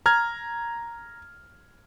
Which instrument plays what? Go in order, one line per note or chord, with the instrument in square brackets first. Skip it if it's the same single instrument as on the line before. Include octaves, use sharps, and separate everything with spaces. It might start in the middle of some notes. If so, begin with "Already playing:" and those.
[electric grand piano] A#5 F6 G#6